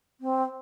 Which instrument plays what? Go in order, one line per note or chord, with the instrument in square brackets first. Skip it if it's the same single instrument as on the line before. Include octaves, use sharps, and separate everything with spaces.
[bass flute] C4